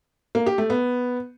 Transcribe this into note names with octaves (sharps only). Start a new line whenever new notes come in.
A#3
G4
A3
B3